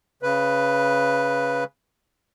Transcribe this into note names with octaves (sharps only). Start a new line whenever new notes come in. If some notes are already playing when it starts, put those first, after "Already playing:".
C#3 B4